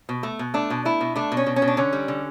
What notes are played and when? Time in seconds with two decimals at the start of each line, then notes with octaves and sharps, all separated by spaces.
0.09 B2
0.23 A3
0.39 B2
0.54 A3 D4
0.70 B2
0.85 A3 E4
1.01 B2
1.16 A3 D4
1.32 B2
1.37 C#4
1.46 B2
1.56 C#4
1.62 B2
1.68 D4
1.77 D3 C#4
1.93 G3
2.08 D3